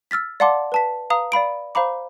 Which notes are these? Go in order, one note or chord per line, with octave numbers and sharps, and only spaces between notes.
E6 F6 A6 B6
D5 F5 F#5 A5 C6 D6
B4 A5 B6
B4 F5 A#5 D#6
D5 F5 B5 D7
C5 F5 A#5 B5 D6